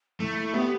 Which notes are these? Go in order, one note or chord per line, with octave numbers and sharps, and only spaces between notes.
A3 E4
B3 G4